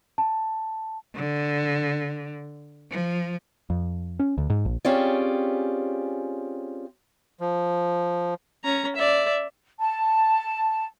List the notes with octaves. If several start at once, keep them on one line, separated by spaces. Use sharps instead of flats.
A5
D3
F3
F2
C#4
D2
G#2
A#1
C4 C#4 F4 G4 G#4 D5
F3
C#4 A#5
D5 E5
A5